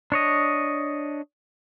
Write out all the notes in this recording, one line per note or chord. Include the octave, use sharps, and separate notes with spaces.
D4 C#5 D#5